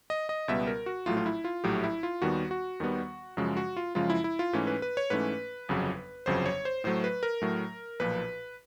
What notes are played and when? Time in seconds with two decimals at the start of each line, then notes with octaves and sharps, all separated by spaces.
0.10 D#5
0.29 D#5
0.48 C#2 B2 G3 B3 E5
0.67 A#4
0.86 F#4
1.06 A#1 A2 F#3 A3 F4
1.17 F4
1.26 E4
1.44 F4
1.64 A#1 A2 F#3 A3 G4
1.84 E4
2.03 F4
2.22 D#2 D#3 G3 B3 F#4
2.51 F#4
2.80 D#2 D#3 G3 B3
3.37 F#2 C#3 F3 G#3 F#4
3.57 F#4
3.77 F4
3.95 F#2 C#3 F3 G#3 F4
4.10 E4
4.24 E4
4.39 F4
4.53 G#2 E3 A3 C#4
4.67 B4
4.82 B4
4.97 C#5
5.10 G#2 E3 A3 C#4 B4
5.69 G1 F2 C#3 F#3
6.26 G1 F2 C#3 F#3 C5
6.46 C#5
6.65 C5
6.84 A2 F#3 A3 C5
7.04 B4
7.23 A#4
7.42 A2 F#3 A3
8.00 B1 A#2 F3 B4